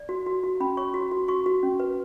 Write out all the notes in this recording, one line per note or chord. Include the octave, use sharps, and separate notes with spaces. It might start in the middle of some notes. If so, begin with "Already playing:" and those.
Already playing: D5
F#4
F#4
F#4
C#4 B5
C#5 C#6
F#4
F#4
F#4 C#6
F#4
C#4
B4